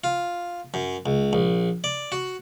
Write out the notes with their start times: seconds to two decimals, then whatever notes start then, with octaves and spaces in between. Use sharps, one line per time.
0.04 F4
0.74 F#2
1.06 C#2
1.33 A#1
1.84 D5
2.12 F#4